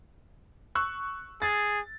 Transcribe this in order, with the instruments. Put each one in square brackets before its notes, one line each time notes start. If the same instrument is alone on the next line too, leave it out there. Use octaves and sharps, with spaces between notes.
[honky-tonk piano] C#6 E6 F#6
[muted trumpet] G#4 [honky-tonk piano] A6